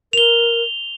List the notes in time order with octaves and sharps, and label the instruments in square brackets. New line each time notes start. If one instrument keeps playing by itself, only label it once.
[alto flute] A#4 [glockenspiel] F7 G7